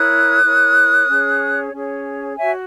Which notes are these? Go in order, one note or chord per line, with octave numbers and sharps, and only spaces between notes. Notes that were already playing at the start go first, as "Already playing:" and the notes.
Already playing: E4 A#4 C#5 D#6 F#6
E4 A#4 C#5
C#4 G#4 C#5
C#4 G#4 C#5
F#4 C#5 E5 G#5